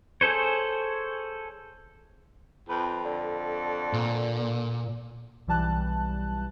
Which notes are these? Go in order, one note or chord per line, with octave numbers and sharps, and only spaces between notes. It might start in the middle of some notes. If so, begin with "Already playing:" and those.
G#4 A4 C5 C#5
F2 B4
D3
A#2
B1 E3 G3 A5 F#6